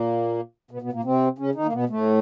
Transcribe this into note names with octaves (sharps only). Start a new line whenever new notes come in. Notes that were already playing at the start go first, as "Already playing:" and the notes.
Already playing: A#2 A#3
B2 B3
B2 B3
A#2 A#3
C3 C4
C#3 C#4
D#3 D#4
A#3
B2 B3
A2 A3